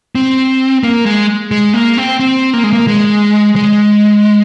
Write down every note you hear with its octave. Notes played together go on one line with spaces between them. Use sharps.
C4
A#3
G#3
G#3
A#3
C4
C4
A#3
G#3
A#3
G#3
G#3